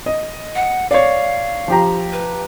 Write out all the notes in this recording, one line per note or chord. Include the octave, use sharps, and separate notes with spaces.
D#5
F#5
C#5 D5 F5
F3 G4 A#5
B4